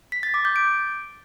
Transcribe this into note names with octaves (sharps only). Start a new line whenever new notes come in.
B6
A6
D6
G6
D7